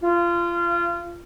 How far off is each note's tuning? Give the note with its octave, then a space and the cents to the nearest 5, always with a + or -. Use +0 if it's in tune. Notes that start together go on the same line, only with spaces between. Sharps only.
F4 -25